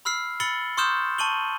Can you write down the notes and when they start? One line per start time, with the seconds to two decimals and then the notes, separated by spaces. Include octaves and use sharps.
0.05 B5 E6 F6 C7
0.40 B5 E6 A6 C#7 F#7 G7
0.77 C6 C#6 D#6 F6 G6 E7
1.18 A5 C#6 D#7 F#7 G7